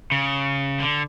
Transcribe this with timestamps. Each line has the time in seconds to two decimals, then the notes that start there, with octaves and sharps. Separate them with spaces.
0.12 C#3
0.80 D3